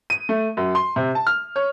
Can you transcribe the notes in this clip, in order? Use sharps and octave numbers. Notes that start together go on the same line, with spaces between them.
D#7
A3
F#2
C6
C3
A5
F6
C#5